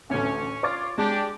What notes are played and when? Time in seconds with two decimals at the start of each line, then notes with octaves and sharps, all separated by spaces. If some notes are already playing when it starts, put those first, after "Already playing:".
0.10 A1 D2 C#4
0.63 F4 C#5 D6 A6
0.98 G#3 D4 G4